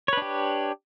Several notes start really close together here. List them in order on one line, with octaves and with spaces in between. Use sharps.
C#5 B4 D4 G4